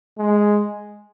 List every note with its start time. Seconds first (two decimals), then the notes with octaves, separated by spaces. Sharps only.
0.18 G#3